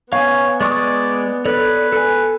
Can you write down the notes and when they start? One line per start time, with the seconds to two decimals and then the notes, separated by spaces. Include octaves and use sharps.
0.13 B3 C#5 F5 G#5
0.61 G#3 D5 C#6 D#6
1.45 A4 B4 C#5 D5
1.92 A4 G#5